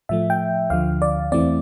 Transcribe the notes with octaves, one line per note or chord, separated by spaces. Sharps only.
A2 F3 A3 E5
G5
D2 D3 F3 F5
D5
E2 E3 A3 C4 D5